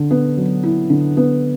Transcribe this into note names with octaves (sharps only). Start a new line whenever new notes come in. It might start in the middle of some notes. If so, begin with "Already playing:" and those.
Already playing: D3
B3
F#3
E4
D3
B3